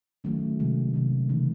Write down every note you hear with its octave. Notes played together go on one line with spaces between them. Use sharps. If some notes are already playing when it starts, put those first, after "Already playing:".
D#3 F#3 A3 C#4
C3 D#3 G#3
C3 D#3 G#3
C#3 E3 A3 C4 D#4